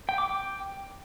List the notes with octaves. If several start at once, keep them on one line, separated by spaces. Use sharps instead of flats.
G5
D6
G5